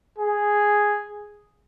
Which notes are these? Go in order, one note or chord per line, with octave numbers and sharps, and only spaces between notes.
G#4